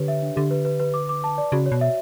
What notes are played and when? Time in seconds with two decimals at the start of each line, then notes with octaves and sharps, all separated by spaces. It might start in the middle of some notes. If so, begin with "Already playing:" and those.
Already playing: D3 G4 B4 C#5
0.08 E5
0.22 D4
0.36 D3 G4
0.51 B4
0.65 B4
0.79 B4
0.94 D6
1.09 D6
1.24 A5
1.38 D5
1.52 C#3 F#4
1.66 C#5
1.72 B2
1.81 E5